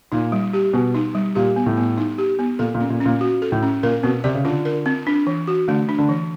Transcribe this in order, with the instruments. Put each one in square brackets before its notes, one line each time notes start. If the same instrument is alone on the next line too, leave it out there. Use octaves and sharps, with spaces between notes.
[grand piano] A#2 [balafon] D#4
[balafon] G3
G4
[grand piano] B2 [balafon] B3
[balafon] D#4
G3
[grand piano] A#2 [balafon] G4
[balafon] B3
[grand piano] A2
[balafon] B3
D#4
G4
B3
[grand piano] A#2 [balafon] A4
[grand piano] A#2
[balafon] C#4
[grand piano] A#2
[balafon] C#4
[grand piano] A#2
[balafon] F#4
A4
[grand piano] A2
[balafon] C#4
[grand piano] A#2 [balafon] A#4
[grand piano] B2 [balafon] C4
[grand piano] C3 [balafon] D5
[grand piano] C#3
[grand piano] D3 [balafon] F4
[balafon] A#4
C4
D4
E3
F#4
[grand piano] D3 [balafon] A3
[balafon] D4
[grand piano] D3
[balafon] E3